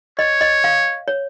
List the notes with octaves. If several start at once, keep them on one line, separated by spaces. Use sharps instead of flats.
C#5 D#5
D#5
F5
C#5